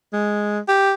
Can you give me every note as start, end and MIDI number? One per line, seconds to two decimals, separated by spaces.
0.13 0.59 56
0.68 0.94 67